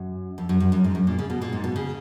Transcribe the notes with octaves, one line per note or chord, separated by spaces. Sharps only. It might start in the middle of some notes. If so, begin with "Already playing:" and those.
Already playing: F#2
F2
F#2
F#2
F#2
G#2
F#2
A#2
C#3
B2
A#2
G#2
B2
C#3